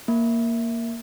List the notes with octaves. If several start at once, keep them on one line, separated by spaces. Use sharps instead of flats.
A#3